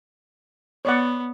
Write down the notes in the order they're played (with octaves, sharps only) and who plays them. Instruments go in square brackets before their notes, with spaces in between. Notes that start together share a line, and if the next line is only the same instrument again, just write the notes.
[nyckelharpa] B3 [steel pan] C#5 D5 F#5